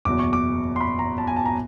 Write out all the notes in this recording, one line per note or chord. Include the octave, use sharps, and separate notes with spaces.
F#1 E2 B2 D6
C#6
D6
C6
B5
A#5
A5
G#5
A5
A#5